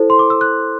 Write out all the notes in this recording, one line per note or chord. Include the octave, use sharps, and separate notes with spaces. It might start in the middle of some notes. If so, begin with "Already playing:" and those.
Already playing: E4 A4 C5
C6
D6
E6
F#6